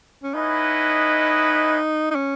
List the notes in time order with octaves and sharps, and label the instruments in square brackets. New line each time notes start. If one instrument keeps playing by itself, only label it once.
[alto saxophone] C#4
[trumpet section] C#4 E4 B4 D#5 F#5 [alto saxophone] D#4
[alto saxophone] D#4
C#4